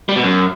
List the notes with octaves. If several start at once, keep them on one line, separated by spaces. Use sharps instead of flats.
G3
B2
F#2